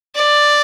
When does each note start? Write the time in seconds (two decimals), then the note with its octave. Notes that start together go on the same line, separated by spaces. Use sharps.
0.15 D5